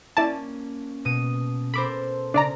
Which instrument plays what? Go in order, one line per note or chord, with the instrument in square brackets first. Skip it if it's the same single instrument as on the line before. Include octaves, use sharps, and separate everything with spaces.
[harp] A#3 C#4 [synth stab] E4 D5 A5
[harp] B2 D#6 D#7
[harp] A4 A#4 C5 [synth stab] B5 D6
[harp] C#3 [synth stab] D4 D5 A#5